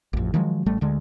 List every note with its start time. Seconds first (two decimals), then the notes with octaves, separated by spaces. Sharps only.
0.13 A1 F2
0.34 D#3 F3 F#3 G#3
0.66 A1 G3 A3
0.81 D2 D3 G#3